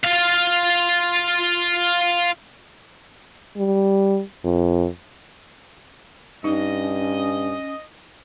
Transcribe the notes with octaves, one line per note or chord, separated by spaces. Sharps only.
F4 F5
G3
F2
G2 C#4 D#4 D#5